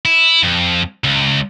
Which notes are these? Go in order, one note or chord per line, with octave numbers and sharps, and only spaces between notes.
E4
F2
C#2